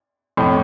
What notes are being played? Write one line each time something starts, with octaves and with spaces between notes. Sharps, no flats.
F2 A2